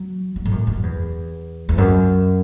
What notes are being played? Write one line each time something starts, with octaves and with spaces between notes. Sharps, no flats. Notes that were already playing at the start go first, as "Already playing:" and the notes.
Already playing: F#3
F#3
A2
F#2
F#2
E2
E2
F#2